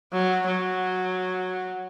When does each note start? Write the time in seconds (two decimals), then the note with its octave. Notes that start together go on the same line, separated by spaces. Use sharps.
0.13 F#3
0.46 F#3